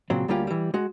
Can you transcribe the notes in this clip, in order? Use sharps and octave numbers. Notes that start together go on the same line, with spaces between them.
A#2 C#3 F#3 C4
D2 G3 A#3 C#4 F4 G4
E3 G3
G#3 F#4